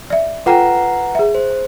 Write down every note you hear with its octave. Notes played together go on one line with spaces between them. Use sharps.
D5 E5
F4 A4 B4 F#5 G5 A#5
G#4 E5
C5